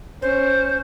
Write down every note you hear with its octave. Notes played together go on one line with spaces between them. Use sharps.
C#4 C5